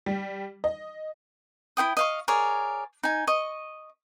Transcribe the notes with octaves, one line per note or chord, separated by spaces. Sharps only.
G3
D#5
E4 C5 G5 D#6
D#5 F5 C#6
G#4 A#4 C#5 D5
D#4 G#5
D#5 C#6